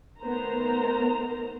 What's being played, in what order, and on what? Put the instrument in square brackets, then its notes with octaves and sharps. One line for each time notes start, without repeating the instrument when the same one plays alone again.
[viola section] D#3 A3 B3 A#4 C5 A#5